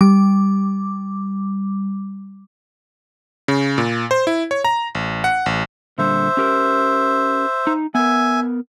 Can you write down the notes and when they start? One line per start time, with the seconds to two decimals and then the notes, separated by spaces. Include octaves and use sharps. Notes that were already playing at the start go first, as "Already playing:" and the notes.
0.01 G3 D6
3.48 C#3
3.78 A#2
4.11 C5
4.27 E4
4.51 C#5
4.64 A#5
4.95 A1
5.24 F#5
5.46 A1
5.98 A#2 D3 G3 C5 E5
6.37 C#4 G4 A#4
7.67 D#4
7.95 B3 A#4 E5 G#5